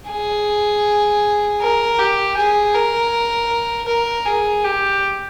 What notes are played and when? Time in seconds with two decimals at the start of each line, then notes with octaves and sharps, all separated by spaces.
0.10 G#4
1.61 A#4
1.99 G4
2.37 G#4
2.74 A#4
3.88 A#4
4.26 G#4
4.64 G4